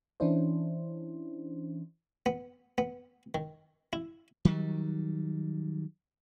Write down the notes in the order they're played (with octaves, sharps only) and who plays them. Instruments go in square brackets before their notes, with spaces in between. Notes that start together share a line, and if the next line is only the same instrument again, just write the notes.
[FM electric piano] E3 C#4 D4 E4 C5
[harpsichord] B3
B3
D#3
E4
[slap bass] D#3 F#3 G3